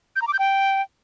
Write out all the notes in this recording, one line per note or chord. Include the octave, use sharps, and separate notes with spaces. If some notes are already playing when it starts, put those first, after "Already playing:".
G6
A#5
D6
G6
G5